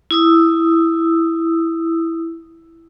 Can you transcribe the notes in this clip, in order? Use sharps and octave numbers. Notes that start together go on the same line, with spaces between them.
E4 D#6 E6